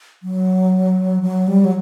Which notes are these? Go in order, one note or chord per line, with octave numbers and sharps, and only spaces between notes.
F#3
F#3
G3
F#3